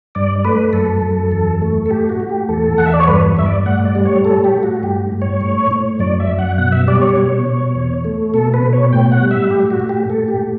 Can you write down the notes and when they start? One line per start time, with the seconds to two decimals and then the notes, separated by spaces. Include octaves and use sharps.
0.15 G2 D5
0.45 A3 B4
0.73 F#2 A4
1.02 F#2
1.31 E2
1.62 A3
1.86 A4
1.91 A2 G4
2.09 F#4
2.20 A2
2.29 G4
2.49 E2 A4
2.78 E2 F#5
2.86 E5
2.94 D5
3.00 C#5
3.07 G2 B4
3.37 G2 E5
3.46 D5
3.66 A2 F#5
3.85 D5
3.95 G3
4.05 C#5
4.25 A2 A4
4.44 G4
4.54 A2
4.63 F#4
4.83 G2 G4
5.12 G2
5.22 C#5
5.41 A2
5.71 A2
5.99 F#2 D5
6.20 E5
6.29 F#2
6.39 F#5
6.58 B2 F#5
6.72 E5
6.88 G3 D5
7.02 C#5
7.16 B2
7.46 B2
7.75 E2
8.05 A3
8.34 B2 A4
8.54 B4
8.63 B2
8.73 C#5
8.92 A2 G5
9.12 F#5
9.21 G3
9.31 E5
9.50 A2 G4
9.71 F#4
9.80 A2
9.89 G4
10.09 A2 A4
10.28 G4
10.38 A2